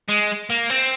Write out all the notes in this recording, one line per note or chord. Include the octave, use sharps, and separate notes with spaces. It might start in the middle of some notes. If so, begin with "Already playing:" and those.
G#3
A#3
C4